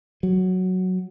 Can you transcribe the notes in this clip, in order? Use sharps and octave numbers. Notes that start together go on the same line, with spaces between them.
F#3